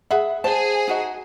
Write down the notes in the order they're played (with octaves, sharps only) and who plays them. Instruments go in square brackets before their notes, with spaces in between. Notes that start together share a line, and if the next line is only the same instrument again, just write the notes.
[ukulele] G#4 E5 B5 [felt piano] F#5
[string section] G#4 [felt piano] C5 [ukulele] A5
[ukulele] D#4 F#4 D#5